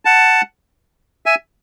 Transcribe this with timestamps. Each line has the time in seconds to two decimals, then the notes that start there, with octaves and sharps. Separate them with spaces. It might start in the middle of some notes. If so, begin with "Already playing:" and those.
0.05 F#5 A5
1.26 E5 G#5